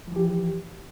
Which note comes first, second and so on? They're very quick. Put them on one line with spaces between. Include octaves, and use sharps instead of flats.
F3 E3 G4